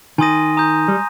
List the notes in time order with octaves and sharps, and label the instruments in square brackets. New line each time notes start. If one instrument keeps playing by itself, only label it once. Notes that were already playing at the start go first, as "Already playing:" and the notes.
[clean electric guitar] D#3 [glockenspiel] G#5 C6 D#6 A#6 D#7
[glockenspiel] A#5 D#6 G6
[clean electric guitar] G3